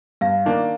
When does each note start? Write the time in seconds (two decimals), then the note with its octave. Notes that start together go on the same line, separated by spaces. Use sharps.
0.21 G2 F5
0.45 D#3 A#3 D4